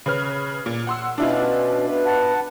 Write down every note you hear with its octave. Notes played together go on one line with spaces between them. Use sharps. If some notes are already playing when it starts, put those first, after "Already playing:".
C#3 B4 F6
A#2
F#5 C6 E6
B2 C#4 D4 E4 F4
B3 B4
F#5 A5